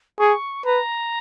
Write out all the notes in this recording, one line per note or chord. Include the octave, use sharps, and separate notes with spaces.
G#4 C#6
B4 A#5